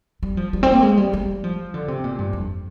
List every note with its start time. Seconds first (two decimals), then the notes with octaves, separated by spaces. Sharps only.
0.23 G3
0.37 F3
0.53 G3
0.63 C4
0.74 A#3
0.82 G#3
0.97 G3
1.13 G3
1.44 F3
1.74 D3
1.88 C3
2.04 A#2
2.18 G2
2.33 F2